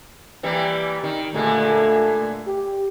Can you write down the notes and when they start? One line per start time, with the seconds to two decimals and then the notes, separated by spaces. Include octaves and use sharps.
0.43 E3 G3 A#3
1.03 D#3
1.34 A#2 D3 G#3 A3
2.47 G4